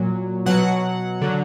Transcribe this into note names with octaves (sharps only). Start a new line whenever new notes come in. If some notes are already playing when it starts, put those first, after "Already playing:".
Already playing: A#2 F#3
B2 F#3 F#5
D3 F#3